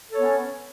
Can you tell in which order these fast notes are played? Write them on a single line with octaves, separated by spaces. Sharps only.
A4 C#5 B3 C#4